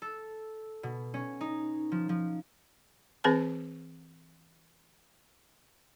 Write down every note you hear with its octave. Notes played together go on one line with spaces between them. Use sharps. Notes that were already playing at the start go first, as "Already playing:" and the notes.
A4
B2
C#4
D#4
F3
F3
E3 C4 G#4 B4 A5